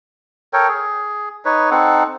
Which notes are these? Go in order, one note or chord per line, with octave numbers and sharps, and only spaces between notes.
A4 A#4 C#5 G5
G#4
D#4 B4 C#5
C4 D#4 A4 F#5